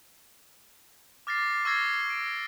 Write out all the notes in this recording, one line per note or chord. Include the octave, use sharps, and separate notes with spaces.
D6 F6 A6 A#6 C7
C#6 E6 F6 G#6 A#6 C7
D7